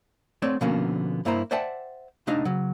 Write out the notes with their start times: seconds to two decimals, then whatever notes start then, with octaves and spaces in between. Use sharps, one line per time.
0.42 A3 C4 C#5 D5
0.61 B2 D3 F3 A#3 B3 C#4
1.25 G2 A#3 E4 C5 A#5
1.51 C5 D5 E5 F#5 G5 A5
2.27 C2 A3 D4 D#4 D#5 F5
2.45 C#3 F#3